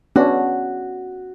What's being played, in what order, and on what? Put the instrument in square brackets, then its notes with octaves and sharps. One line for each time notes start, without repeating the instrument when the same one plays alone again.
[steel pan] B3 C#4 D4 [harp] F#4